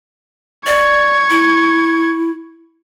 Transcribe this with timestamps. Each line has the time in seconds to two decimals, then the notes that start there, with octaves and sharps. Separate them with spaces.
0.67 D5 C#6 G#6
1.30 E4